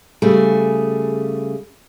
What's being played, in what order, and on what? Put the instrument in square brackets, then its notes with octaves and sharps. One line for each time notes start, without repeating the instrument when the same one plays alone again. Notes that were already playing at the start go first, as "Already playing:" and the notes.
[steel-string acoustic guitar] C#3 G3 A3 G#4